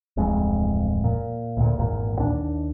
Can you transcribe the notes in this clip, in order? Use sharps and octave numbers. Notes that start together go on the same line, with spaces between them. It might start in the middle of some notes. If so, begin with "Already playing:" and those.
D1 A1 F2 G#3
A#2
D2 A#2
G#1 E2 A#2
D#2 D4